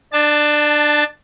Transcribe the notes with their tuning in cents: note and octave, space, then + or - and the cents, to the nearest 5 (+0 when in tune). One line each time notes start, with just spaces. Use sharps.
D4 +20 A5 +0